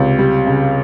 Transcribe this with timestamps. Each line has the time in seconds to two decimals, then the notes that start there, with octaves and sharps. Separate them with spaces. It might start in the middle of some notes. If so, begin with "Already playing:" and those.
Already playing: C#2 C3
0.19 G3
0.47 C#3